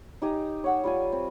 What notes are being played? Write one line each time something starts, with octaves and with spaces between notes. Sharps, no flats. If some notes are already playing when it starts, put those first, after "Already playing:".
D#4 G4 G#5 A#5
C#5 F#5 E6
G3 F4 G#5
C4